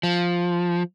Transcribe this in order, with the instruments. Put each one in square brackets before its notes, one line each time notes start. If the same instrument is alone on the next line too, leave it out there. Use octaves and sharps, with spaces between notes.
[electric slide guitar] F3